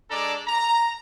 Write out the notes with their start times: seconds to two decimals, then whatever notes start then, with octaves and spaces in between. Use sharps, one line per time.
0.10 G#3 D4 A4 D5 A#5
0.47 A#5